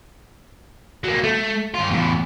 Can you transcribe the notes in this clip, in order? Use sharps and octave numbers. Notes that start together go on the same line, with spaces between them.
F#3 A#3
A3
G2 F4
E2 A2